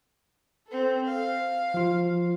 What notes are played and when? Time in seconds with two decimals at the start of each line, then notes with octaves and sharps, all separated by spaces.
0.67 C4 A4
1.05 F5
1.74 F3 F4